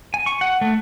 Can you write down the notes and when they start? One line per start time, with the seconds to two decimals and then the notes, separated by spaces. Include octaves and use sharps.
0.14 G#5
0.26 C#6
0.41 F#5
0.61 A3